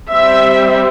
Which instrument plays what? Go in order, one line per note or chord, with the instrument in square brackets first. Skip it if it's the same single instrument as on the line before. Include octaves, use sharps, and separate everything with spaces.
[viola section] G3 C4 E5